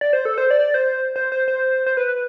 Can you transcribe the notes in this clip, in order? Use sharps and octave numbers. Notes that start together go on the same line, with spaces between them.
D5
C5
A4
C5
D5
C5
C5
C5
C5
C5
B4